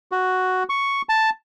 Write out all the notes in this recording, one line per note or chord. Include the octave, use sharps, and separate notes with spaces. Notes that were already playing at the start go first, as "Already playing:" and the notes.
F#4
C#6
A5